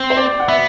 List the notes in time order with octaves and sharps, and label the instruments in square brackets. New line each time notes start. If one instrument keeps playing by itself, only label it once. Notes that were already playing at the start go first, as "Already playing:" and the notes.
Already playing: [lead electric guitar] C4
[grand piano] C5
D5
F#5
[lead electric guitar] B3 [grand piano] E5